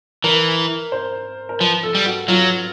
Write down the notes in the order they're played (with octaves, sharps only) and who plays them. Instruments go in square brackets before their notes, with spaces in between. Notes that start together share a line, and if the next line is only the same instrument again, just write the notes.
[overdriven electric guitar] E3 [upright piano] A#4
[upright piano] C5
A#4
[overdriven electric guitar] F3 [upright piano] B4
[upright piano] A4
[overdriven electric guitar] G3
[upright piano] F#4
[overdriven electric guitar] F#3 [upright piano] F4